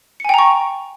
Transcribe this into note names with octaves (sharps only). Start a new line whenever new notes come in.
G5 G#5 A#5 C#6 C#7